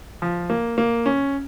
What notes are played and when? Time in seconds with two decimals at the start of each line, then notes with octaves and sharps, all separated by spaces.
0.22 F3
0.50 A#3
0.78 A#3
1.06 C#4